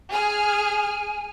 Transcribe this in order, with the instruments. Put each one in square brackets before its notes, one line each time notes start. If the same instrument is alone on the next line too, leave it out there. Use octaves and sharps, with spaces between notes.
[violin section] G#4 F6 [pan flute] G#5